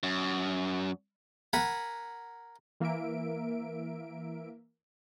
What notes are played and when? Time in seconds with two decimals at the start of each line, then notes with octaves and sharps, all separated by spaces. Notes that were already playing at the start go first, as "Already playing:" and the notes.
0.03 F#2
1.53 A#4 F#5 G#5 B5
2.80 E3 A#3 A#4 E5 D7